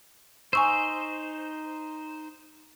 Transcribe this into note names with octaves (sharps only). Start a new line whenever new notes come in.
D#4 C5 G#5 C#6 E6